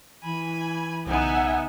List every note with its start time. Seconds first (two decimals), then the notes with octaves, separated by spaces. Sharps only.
0.23 E3 G#5 B5
1.06 B1 C#3 B3 D#4 E5 F#5 G#5